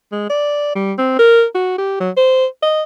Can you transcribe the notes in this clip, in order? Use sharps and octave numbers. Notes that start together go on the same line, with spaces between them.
G#3
D5
G3
C4
A#4
F#4
G4
F#3
C5
D#5